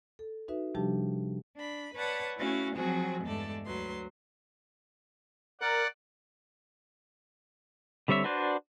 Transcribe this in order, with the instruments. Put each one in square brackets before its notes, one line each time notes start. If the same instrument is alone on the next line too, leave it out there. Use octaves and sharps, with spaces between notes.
[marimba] A4
D#4 F#4 B4 E5
C3 F3 G3 D4 G4 A5
[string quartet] D4 B5
B4 C#5 D5 F#5 A5 B5
A3 C#4 E4 F#4 F5
F3 F#3 C4 F#4 G#4
E2 G2 G#3 A3 A4 D5
D2 F#3 B4 C6
[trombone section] A#4 [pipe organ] D5 F#5
[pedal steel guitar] D3 G3 C4 C#5 E5
D4 F#4 B4 C5 D5